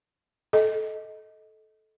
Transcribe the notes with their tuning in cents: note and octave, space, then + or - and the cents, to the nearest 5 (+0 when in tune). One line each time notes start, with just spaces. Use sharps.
A4 -15 D#5 +15